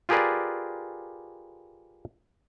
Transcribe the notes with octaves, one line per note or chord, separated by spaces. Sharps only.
F4 G4 G#4 A#4 B4 D5